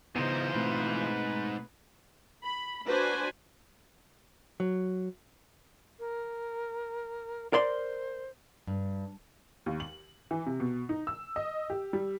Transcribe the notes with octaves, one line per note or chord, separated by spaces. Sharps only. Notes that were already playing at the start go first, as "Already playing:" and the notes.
G#2 C#3 E3 F3 B3 D#4 C5
B2 A3 C4 B4
B5
D4 F#4 B4 C5 G#5
F#3
A#4
A#4 C5 D5 C6
G2
D#2
F#7
E3
C3
B2
D#4
E6
D#5
G4
G3